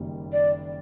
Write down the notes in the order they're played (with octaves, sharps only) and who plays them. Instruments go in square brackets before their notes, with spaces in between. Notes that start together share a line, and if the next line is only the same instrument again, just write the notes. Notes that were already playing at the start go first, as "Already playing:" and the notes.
Already playing: [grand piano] F#1 F#2 D#3 G3
[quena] D5